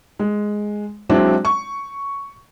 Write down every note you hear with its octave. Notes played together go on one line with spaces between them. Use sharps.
G#3
F#3 G#3 C4 D4 E4
C#6